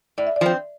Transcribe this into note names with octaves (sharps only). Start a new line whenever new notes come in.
A2 D5
E5
D5
F3 C4